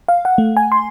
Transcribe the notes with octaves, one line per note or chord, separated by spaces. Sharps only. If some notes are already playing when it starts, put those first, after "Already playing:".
F5
F#5
A3
G#5
C6